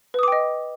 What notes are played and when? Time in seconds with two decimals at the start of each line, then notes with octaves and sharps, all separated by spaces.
0.14 B4
0.19 D#6
0.23 D6
0.28 G5
0.32 D#5